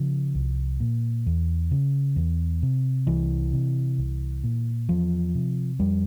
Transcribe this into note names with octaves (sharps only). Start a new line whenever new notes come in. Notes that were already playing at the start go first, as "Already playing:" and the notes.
Already playing: C#3 F3
C2
A#2
E2
C#3
E2
C3
C2 E3
C3
C2
A#2
E2 F3
C3
F2 G3